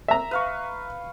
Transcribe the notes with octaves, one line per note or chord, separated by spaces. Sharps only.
E5 A#5
B4 F5 C#6